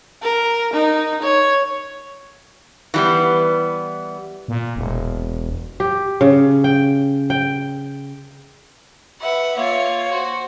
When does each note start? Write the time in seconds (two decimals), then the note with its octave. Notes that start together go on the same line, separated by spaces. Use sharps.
0.22 A#4
0.73 D#4
1.22 C#5
2.94 E3 G3 B3
4.48 A#2
4.76 E1
5.80 G4
6.21 C#3
6.64 G5
7.30 G5
9.20 B4 E5 F#5
9.58 A#3 F4 C#5
10.11 F#4 C5